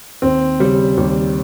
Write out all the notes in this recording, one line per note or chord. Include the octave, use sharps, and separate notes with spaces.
D#2 C4
C#3 G3
D#2 G3